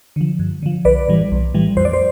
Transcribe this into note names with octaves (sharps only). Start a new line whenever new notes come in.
D3 F3
G2
D3 F3
B1 B4 D5
A2 E3 G3
B1
A2 E3 G3
F2 C5
D5
C5